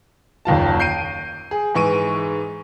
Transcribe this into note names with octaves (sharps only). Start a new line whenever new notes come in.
F#1 D#2 F4 A5
G6 C7 D7 D#7
G#4
G#2 E3 C#6 D7 D#7